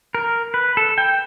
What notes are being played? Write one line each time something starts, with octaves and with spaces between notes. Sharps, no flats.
A#4
B4
A4
G5